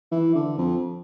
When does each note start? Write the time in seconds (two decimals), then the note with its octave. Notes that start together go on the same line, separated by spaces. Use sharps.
0.12 E3
0.35 D3
0.58 F2